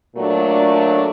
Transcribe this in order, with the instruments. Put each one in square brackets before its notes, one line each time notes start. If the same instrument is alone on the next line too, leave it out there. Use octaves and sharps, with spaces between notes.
[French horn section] A#2 F#3 A3 D4